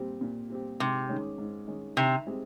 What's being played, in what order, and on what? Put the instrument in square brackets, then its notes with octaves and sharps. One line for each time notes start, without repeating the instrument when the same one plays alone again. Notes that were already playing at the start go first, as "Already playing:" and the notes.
Already playing: [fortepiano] A#2 G3 C4 G4
A#2
G3 C4 G4
[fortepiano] G#2 [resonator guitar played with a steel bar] C3
[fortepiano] D#3 G#3 C#4
G#2
D#3 G#3 C#4
[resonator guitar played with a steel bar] C3 [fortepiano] D#3
[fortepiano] G#3 C4 G4